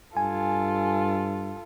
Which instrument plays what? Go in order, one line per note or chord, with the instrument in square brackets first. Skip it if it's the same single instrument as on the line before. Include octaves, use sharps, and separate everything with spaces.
[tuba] G2 [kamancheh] F4 A4 [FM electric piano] G#5